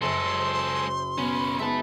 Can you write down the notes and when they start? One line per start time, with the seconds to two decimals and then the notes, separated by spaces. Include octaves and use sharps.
0.02 F#1 F#2 G#3 A4 C6
0.37 C5
1.18 B1 B3 C#4 B5
1.60 G#3 B3 D#4 E5 A5 B5